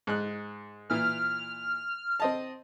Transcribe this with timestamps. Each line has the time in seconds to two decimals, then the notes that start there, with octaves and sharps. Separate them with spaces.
0.07 G#2 F#6
0.90 A#2 E3 F6
2.20 C4 D#5 A5